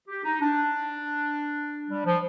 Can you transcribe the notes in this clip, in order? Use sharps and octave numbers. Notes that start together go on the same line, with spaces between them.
G4
D#4
D4
G3
F3